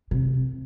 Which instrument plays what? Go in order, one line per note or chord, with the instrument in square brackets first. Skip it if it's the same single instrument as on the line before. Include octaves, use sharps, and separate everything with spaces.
[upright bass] C3